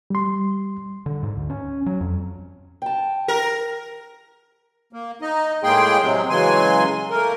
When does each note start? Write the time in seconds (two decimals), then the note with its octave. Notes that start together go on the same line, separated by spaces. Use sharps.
0.10 G3 C6
1.06 D3
1.23 G#2
1.37 D2
1.50 C#4
1.86 F#3
2.01 F2
2.82 G5 A5
3.28 A#4
4.93 A#3
5.22 D#4 D#5
5.64 A2 G#3 A#3 G#4 G5 C6
6.00 C3 F#3 G#3
6.30 C#3 E3 F#3 G#3 G#5 C6
7.11 A3 A#3 A#4